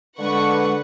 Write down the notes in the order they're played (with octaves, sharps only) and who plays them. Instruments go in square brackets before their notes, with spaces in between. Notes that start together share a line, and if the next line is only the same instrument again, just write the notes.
[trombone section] D3 [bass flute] G#3 [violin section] B4 F#5 C#6